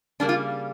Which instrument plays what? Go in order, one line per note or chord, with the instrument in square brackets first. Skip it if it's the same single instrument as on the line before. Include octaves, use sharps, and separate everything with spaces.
[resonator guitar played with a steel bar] C#3 G3 A#3 D4
F4